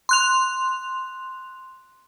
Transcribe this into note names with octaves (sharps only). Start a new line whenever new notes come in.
C6 F#6 F7